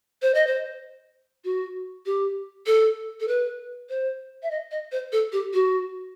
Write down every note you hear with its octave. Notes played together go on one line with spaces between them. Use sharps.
C5
D#5
C5
F#4
G4
A4
A4
B4
C5
E5
D#5
D#5
C5
A4
G4
F#4